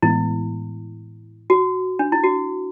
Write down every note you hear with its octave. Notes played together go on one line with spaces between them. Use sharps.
A2 E3 G#3 B3 E4
F#4
D4
E4
F#4